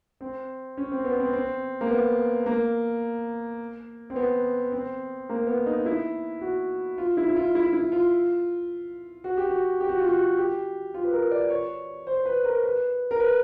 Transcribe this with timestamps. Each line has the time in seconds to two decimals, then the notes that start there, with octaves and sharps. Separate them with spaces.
0.21 C4
0.77 C#4
0.92 C4
1.05 B3
1.20 C4
1.33 C4
1.81 A#3
1.90 B3
2.46 A#3
4.10 C4
4.16 B3
4.72 C4
5.29 A#3
5.47 B3
5.66 D#4
5.86 E4
6.41 F#4
6.98 F4
7.17 E4
7.29 E4
7.36 F4
7.55 E4
7.73 E4
7.92 F4
9.24 F#4
9.37 G4
9.50 F#4
9.80 G4
9.89 F#4
9.99 F4
10.07 F#4
10.38 G4
10.94 F4
11.04 B4
11.13 A#4
11.31 D5
11.50 C#5
12.07 C5
12.25 B4
12.45 A#4
12.63 B4
13.11 A#4
13.20 B4